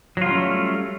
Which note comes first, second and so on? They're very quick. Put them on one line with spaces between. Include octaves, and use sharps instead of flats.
F#3 F4 G3 C#4 A3